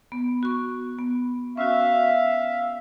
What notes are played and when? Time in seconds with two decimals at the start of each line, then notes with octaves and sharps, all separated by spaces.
0.12 B3
0.43 F#4 C#6
0.98 B3
1.57 C#4 F#4 E5 F5